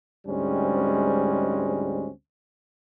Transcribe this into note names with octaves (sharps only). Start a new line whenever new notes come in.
D2 G#2 G3 G#3 C4 C#4